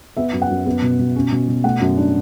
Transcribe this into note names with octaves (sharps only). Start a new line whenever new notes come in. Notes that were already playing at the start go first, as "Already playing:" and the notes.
B3 E5
F#2
F#5
F#2
B3
B2
B2
C#4
B2
B2
A3 F#5
F#2
D4